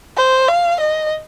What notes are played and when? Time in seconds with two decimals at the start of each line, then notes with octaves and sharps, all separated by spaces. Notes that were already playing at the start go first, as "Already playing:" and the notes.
0.17 C5
0.48 F5
0.81 D#5